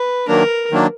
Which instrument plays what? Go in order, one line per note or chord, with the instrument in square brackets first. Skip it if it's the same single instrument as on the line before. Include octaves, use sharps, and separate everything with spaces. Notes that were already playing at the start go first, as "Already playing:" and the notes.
Already playing: [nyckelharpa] B4
[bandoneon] D#3 F#3 A#3 D4 [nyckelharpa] A#4
[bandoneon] D#3 F#3 A#3 D4